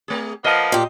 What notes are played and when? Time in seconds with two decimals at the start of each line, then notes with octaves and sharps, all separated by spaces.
0.08 A3 G#4
0.44 F3 A#3 B3 D#5
0.72 A#2 G4